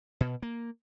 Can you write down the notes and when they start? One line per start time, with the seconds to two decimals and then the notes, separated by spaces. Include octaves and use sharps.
0.21 B2
0.42 A#3